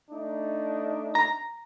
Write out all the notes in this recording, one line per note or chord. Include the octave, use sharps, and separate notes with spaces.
A3 D4 D#4
A#5